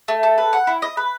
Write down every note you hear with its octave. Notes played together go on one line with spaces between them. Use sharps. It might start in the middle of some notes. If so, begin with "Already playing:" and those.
A3
A4
B4
F#5
E4
D#5
B4